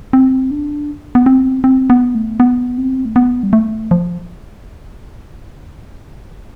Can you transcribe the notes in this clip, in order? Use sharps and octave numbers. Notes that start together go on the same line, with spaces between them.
C4
D4
B3
C4
C4
B3
A3
B3
C4
A3
B3
G3
A3
F3